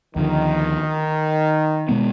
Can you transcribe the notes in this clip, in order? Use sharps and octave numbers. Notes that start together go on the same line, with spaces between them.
D2 D3 D#3 F3
B2 G#3 B3